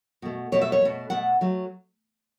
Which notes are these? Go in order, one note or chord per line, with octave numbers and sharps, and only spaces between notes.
B2 A3
B2 A3 C#5
E5
C#5
B2 A3
B2 A3 F#5
F#3 A3